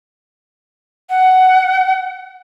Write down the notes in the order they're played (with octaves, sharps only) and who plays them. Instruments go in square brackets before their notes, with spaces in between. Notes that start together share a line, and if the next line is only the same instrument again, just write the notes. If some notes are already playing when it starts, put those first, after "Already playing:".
[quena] F#5